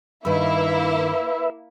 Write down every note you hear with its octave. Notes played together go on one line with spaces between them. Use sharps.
G2 D#3 A#3 E4 B4 E5